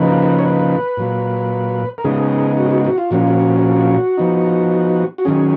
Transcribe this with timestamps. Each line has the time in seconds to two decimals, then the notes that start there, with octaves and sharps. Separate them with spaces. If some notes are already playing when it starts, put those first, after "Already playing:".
Already playing: C#3 F3 A#3 D#4 B4
0.39 C#5
0.45 B4
0.97 A#2 F#3 A#3
1.98 A#4
2.04 C#3 G#3 B3 D#4 G#4
2.58 F#4
2.71 F#4
2.85 F#4
2.98 F4
3.11 A#2 F3 A#3 C#4 F#4
3.19 F4
3.27 F#4
4.17 F3 B3 D#4
5.18 F#4
5.25 D#3 F#3 C#4 G#4